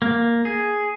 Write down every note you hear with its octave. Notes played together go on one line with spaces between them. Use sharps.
A#3
G#4